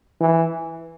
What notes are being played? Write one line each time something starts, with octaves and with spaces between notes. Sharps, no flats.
E3